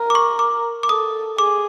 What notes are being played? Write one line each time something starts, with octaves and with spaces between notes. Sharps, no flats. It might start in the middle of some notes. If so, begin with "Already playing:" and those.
Already playing: A#4
D6
C#6
D6
D6
A4 D#6
G#4 D6